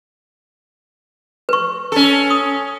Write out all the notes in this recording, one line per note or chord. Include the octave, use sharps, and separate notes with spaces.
B4 C#6
C#4 A4
D#6